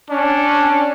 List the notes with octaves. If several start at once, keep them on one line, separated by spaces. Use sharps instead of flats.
C#4 D4